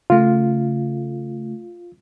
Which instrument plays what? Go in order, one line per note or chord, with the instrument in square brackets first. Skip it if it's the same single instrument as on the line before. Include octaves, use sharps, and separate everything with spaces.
[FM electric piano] C#3 A3 [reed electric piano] F4